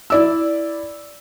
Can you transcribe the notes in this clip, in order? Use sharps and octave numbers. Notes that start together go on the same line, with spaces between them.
E4 D5 E6